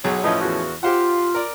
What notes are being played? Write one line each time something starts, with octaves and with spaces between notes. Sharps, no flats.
B1 F#3 G#4 C#5
A2 F3 C#4 E4 B4 D#5
E2 F#4
F4 G4 C5 F#5
A#4 D5